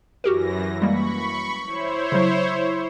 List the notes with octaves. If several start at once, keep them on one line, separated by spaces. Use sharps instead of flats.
F#2 E3 F#4 G4 A#4 A#6
G3 G#3 A#3 B5 C#6
E4 C5 C#5
C#3 F#3